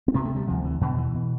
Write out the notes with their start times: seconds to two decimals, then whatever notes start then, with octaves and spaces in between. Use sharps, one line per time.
0.08 C4
0.14 D2 C3 B3
0.25 A3
0.36 G3
0.47 D2 C3 F3
0.64 E3
0.81 E2 B2 D3
0.98 E3
1.15 B2